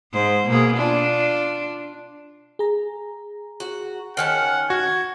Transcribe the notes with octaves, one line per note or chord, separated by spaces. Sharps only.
G#2 C5
B2 A#3 G#4
D4 F4
G#4 A#5
F#4
D#3 C#4 F#5 A5
F#4 G#6